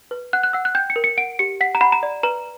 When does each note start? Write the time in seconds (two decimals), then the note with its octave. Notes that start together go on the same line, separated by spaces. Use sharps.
0.11 B4
0.33 F#5 F#6
0.43 F#6
0.53 F#5 E6
0.65 F#6
0.75 G5 G6
0.90 C#7
0.96 A#4
1.04 C#7
1.17 F#5 D7
1.39 G4 C#7
1.61 F#5 B6
1.75 A#5
1.81 F#5 B5
1.92 A#5
2.03 D5
2.23 B4 A#5